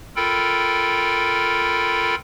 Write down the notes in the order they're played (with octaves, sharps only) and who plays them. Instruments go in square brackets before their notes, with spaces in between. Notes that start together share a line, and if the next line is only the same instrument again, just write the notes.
[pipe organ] F4 A4 A#4 G5 B5